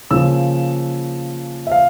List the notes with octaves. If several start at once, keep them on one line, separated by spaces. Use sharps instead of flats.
C#3 F3 A#3 E6
E5
F5